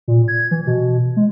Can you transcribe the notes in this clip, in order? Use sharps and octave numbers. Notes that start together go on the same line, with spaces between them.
A#2
G#6
E3
B2
G#3